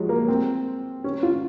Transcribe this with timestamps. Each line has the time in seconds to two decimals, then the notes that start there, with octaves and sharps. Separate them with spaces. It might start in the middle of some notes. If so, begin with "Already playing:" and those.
Already playing: F3 F#3 G#3
0.09 A#3
0.28 C4
1.04 C#4
1.23 F4